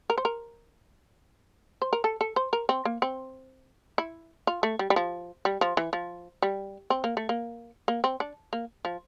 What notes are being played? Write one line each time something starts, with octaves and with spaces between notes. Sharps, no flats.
A#4
C5
A#4
C5
A#4
A4
A4
C5
A#4
C4
A#3
C4
E4
F4
A3
G3
G3
F3
G3
F3
E3
F3
G3
C4
A#3
A3
A#3
A#3
C4
D4
A#3
F3